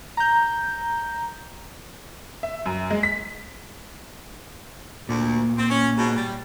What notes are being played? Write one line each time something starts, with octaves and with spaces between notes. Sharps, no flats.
A#5 G6
E5
F#2
G#3
B6
D2 A#2
C4
C#4
G#2 B2
G3